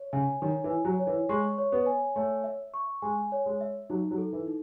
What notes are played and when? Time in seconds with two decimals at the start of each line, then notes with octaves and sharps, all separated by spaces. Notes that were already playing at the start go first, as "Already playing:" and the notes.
Already playing: C#5
0.13 C#3 G#5
0.42 D#3 C#5
0.64 E3
0.70 G#5
0.85 F#3
0.99 C#5
1.07 E3
1.29 G#3 C#6
1.58 C#5
1.72 B3
1.86 G#5
2.16 A3 C#5
2.44 E5
2.74 C#6
3.02 G#3 G#5
3.32 C#5
3.46 G#3
3.61 E5
3.90 F#3 D#4
4.11 F#3
4.18 A4
4.33 E3
4.47 D#4